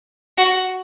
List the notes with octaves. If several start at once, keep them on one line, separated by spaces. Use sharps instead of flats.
F#4